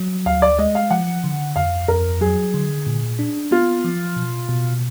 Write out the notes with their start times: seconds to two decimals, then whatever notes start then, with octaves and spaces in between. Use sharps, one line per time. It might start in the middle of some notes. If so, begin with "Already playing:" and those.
Already playing: F#3
0.26 D2 F5
0.42 D5
0.58 G#3 D#5
0.75 F5
0.91 F3 F#5
1.24 D3
1.56 F2 F5
1.88 F2 A#4
2.21 F#3 G#4
2.54 D3
2.87 A#2
3.19 D4
3.51 B3 F4
3.84 F3
4.16 B2
4.49 B2